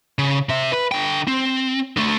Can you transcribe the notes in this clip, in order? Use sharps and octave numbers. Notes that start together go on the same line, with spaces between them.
C#3
C3 E5
B4
D3 G5
C4
D3 A3